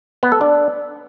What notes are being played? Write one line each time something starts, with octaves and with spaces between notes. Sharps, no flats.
B3
A4
D4